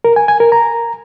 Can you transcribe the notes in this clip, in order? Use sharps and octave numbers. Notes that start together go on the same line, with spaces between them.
A#4
G#5
G#5
A#4
A#5